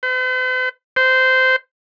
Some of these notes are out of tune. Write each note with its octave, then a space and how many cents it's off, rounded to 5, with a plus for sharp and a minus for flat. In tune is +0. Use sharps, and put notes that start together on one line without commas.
C5 -45
C5 -15